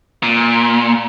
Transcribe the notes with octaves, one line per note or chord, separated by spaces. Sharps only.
A#2